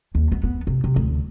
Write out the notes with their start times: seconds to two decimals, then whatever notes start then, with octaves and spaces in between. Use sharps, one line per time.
0.15 D#2
0.32 B3
0.43 B3
0.67 C3
0.84 C3
0.96 D2